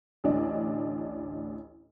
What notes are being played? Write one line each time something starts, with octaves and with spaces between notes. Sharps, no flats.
A1 D2 D4 D#5